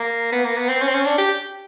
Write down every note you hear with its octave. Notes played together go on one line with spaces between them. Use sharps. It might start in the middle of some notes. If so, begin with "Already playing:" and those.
Already playing: A#3
B3
A#3
B3
C4
C#4
C4
C#4
D4
G4